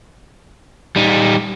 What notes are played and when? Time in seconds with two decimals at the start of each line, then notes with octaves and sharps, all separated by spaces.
0.96 G3 D#4